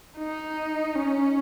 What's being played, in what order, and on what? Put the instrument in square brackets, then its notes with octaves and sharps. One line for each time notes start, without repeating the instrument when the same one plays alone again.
[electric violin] D#4
C#4